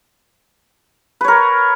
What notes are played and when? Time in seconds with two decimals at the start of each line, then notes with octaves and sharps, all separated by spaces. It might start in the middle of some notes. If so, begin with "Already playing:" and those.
1.21 B4
1.24 C#5
1.28 A#4